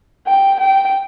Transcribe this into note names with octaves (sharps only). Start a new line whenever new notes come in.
G5
G5